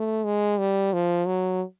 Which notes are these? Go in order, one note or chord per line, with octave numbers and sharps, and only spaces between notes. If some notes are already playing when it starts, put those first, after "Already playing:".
Already playing: A3
G#3
G3
F3
F#3